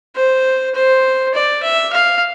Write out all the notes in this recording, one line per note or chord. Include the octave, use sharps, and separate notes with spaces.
C5
C5
D5
E5
F5